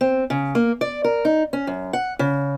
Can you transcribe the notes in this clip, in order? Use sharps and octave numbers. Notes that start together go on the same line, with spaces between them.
C4
C#3
A#3
D5
A#4
D#4
C#4
F#2
F#5
C#3